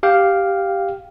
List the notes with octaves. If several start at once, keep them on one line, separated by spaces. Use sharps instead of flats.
G4 F5 G5